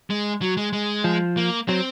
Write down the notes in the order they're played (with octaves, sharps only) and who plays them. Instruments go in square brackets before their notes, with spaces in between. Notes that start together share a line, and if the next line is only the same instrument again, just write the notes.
[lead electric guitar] G#3
F#3
G#3
G#3
[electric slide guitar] F3
[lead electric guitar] A#3
[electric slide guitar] F#3 [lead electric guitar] C4